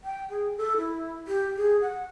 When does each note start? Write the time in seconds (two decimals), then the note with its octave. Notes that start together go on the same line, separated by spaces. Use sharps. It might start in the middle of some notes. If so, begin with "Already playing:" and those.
0.04 G5
0.30 G#4
0.57 A4
0.78 E4
1.27 G4
1.57 G#4
1.82 F#5